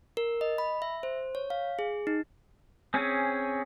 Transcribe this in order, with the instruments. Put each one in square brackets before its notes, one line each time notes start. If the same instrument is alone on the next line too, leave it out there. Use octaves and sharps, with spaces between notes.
[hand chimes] A#4
D#5
B5
E5
C5
C#5
F5
G#4
D#4
[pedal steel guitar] C4 C#4 G#4